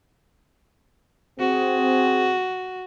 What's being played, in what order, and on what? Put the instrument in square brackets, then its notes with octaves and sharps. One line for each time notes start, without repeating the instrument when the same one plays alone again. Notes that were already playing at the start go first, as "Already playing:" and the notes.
[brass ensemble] C4 G#4 [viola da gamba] F#4